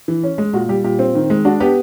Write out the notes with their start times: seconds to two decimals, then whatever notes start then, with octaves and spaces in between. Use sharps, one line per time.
0.08 E3
0.23 C#4
0.38 G#3
0.53 A#2 F#4
0.69 G3 G4
0.84 A#2 G4
0.99 C4
1.15 D#3
1.30 G#3
1.45 D4 F#4
1.60 B3 G4